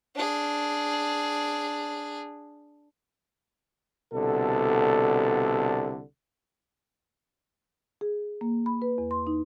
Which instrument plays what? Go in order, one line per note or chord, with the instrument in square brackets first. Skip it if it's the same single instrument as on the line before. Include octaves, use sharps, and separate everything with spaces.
[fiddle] D4 G#4
[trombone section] C2 B2 D3 A4
[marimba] G#4
A#3
B5
B4
E2
C6
D#4